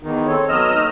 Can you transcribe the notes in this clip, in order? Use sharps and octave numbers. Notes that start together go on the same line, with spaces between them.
E2 D#3 D#4
C4 A4 C#5
F#3 B3 D#5 E6 F6
D#2 A3 D#4